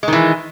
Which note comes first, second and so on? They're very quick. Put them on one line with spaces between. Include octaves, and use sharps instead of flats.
G#3 D#3 E3